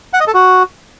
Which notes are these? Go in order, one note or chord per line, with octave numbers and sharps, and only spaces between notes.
F#5
D#5
A4
F#4